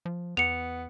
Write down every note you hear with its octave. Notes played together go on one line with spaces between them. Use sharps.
F3
E2 B3 C#7 F7